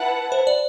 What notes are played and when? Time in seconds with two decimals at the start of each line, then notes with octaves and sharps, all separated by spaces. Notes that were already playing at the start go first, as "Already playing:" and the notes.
Already playing: E4 B4 F#5 A5
0.32 C5
0.47 D5